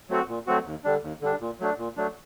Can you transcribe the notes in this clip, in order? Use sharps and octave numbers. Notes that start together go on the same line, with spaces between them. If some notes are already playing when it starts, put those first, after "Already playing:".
F#3 A3 C4 F#4
A#2
F#3 A3 C4 F#4
D#2
D3 G3 D4
D#2
D3 G3 D4
A#2
F#3 A3 D4
A#2
F#3 A3 D4